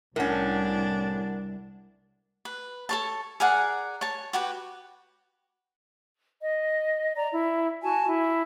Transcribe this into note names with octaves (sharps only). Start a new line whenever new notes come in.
C2 A2 C#4 D4 A#4 F#5
B4
A4 C#5 A5
G#4 A#4 D5 F#5
C#5 A5
F#4 G4 B4
D#5
D5 A#5
E4
F#4 G#5 A5
E4